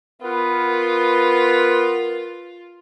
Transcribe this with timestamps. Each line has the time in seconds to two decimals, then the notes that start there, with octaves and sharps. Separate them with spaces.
0.22 B3 F4 A#4 B4